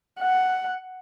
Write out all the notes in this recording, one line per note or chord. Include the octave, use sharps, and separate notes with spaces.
F#5